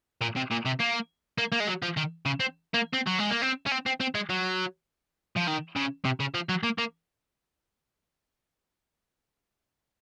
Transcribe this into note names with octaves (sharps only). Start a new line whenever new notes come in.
A#2
C3
A#2
C3
A#3
A#3
A#3
G#3
F#3
F3
D#3
C#3
C4
A#3
C4
F#3
G#3
A#3
C4
C#4
C4
C4
C4
G#3
F#3
F3
D#3
C#3
C3
C#3
F3
F#3
A#3
A#3